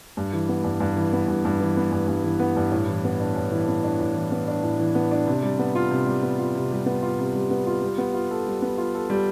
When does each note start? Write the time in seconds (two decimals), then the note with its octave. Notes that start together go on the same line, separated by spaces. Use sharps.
0.17 G2
0.33 E3
0.49 B3
0.64 G2
0.80 G2
0.96 E3
1.13 B3
1.28 G2
1.45 G2
1.61 E3
1.77 B3
1.92 G2
2.08 G2
2.24 E3
2.40 B3
2.56 G2
2.72 A2
2.88 E3
3.04 B3
3.20 D4
3.36 A2
3.51 E3
3.68 B3
3.84 D4
4.00 A2
4.15 E3
4.32 B3
4.48 D4
4.63 A2
4.80 E3
4.95 B3
5.11 D4
5.27 C3
5.43 G3
5.59 B3
5.75 F4
5.91 C3
6.06 G3
6.23 B3
6.39 F4
6.55 C3
6.71 G3
6.86 B3
7.02 F4
7.19 C3
7.35 G3
7.51 B3
7.67 F4
7.82 G3
7.98 B3
8.14 F4
8.31 A4
8.46 G3
8.62 B3
8.78 F4
8.94 A4
9.10 G3